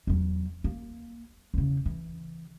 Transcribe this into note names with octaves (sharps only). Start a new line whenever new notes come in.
E2 F#3
A#3
E2 C#3
E3